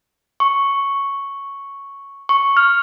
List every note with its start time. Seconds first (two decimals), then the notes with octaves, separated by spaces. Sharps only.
0.40 C#6
2.29 C#6
2.57 F6